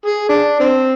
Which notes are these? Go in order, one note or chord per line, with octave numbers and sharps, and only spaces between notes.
G#4
D4
C4